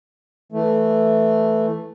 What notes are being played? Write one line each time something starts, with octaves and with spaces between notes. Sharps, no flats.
E3 A3